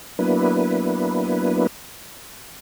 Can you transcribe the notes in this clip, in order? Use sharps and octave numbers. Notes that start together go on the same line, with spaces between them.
F#3 A#3 B3 D4 E4 B4